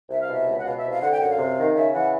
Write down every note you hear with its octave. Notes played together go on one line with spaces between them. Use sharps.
C2 E5
F5
B2 E5
C#2
F#5
B2 F5
E5
C2
F5
D3 F#5
G5
F#2 F#5
F5
C3
D#3
C#3 E5
E3 F#5